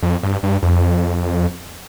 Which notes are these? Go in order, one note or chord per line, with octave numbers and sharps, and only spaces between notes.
F2
G2
G2
F2